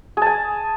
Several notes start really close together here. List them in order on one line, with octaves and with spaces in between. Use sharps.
G#4 A5 G#5